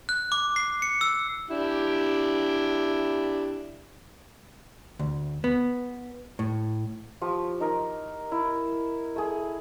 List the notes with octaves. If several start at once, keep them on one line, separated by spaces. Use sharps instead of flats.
F#6
D6
C7
C#7
E6
D4 E4 G4
D2
B3
A2
F3 G4 C#6
D#4 A#4
E4
A3 G#4